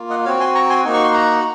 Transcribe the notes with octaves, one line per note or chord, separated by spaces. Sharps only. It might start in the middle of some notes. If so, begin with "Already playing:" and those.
Already playing: A#3 F4
D#5 F#5
C4 F#4 C#5 F5
G#5 C6
A#5 C#6
G#5 C6
A#3 D#4 F#4
C#6
C6
F#5 A#5